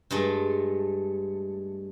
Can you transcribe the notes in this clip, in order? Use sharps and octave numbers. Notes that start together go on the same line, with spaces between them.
G2 G#3 A3